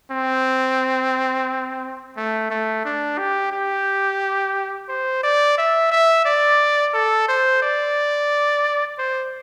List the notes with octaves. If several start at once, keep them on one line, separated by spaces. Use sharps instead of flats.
C4
A3
A3
D4
G4
G4
C5
D5
E5
E5
D5
A4
C5
D5
C5